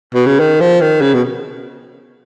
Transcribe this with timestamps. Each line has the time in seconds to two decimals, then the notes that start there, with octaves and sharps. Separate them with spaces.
0.14 B2
0.27 C#3
0.40 D#3
0.61 F3
0.81 D#3
1.01 C#3
1.14 B2